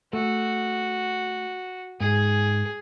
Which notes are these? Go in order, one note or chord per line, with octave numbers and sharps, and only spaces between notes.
A3 F#4
G#2 G#4